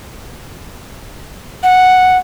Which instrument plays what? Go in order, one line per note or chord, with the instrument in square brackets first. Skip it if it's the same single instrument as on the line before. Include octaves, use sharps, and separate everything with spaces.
[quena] F#5